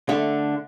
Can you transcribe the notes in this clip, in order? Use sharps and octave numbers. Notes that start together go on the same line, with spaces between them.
D3 A3